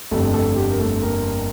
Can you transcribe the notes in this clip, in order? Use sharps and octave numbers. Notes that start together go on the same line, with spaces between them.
G1 F2 D3 G3 A3 A4
A3 A4
G4
A#4
A3 A4
A#3 A#4